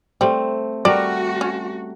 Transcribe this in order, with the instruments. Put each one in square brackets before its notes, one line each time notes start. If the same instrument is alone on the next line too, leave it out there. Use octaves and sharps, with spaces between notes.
[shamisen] G3 [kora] A3 C4
[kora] G3 A3 A#4 [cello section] F#4 [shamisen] D5
[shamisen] C#4